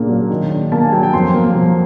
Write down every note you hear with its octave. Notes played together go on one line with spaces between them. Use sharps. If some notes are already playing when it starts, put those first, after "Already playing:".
Already playing: A#2 C#3 A#3 D4
F#3
D#3
D4
A#3 A5
G#5
F#3 G5
G5
F2 C6
A#3
F3